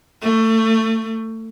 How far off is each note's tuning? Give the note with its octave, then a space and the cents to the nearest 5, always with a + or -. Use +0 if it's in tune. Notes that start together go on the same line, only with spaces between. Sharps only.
A3 +25